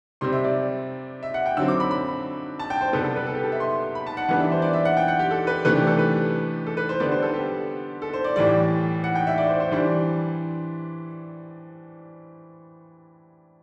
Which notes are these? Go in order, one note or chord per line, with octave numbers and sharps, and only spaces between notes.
C3 G3 C4 C6
E5
D5
E5
F#5
G5
D3 F#3 C4 E6
D6
B5
B5
A5
G5
C5
C3 G3 B3 A4
A4
B4
A4
G4
A4
E5
C6
B5
A5
F#5
E3 G3 B3 D4 F#5
E5
C5
D5
E5
F#5
G5
F#5
G4
A4
B4
C3 E3 A3 D4 B4
G4
A4
B4
A4
B4
C5
D3 G3 B3 D4 D5
C5
A4
G4
A4
C5
D5
A2 E3 G3 D5
F#5
G5
E5
D5
C5
C5
E3 G3 D4 C5